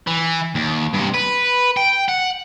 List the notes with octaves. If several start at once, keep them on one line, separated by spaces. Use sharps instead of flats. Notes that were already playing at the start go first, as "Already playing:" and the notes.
E3
D#2
G2 C3
B4
G5
F#5